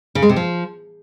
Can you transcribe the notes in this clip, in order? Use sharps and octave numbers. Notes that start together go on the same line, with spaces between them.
C#3
G#3
C3
F3